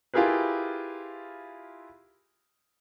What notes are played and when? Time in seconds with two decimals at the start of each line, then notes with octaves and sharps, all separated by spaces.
0.14 E4 F4 G4 G#4 A#4 B4